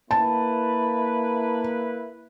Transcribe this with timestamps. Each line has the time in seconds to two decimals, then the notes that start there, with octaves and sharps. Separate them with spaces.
0.11 A#3 E4 B4 A5